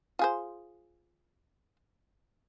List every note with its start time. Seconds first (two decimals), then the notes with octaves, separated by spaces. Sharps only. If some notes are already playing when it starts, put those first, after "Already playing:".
0.19 F4 G#4 C5